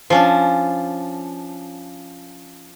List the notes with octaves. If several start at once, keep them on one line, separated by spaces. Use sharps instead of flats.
F3 C#4 D4